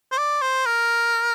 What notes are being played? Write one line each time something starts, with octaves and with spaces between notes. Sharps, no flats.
C5
D5
C5
A#4